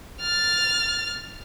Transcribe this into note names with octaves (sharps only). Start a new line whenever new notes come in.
F6 A6